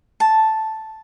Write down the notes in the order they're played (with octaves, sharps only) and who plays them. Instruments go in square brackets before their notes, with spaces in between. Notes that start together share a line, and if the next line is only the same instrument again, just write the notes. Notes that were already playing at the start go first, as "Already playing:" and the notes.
[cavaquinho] A5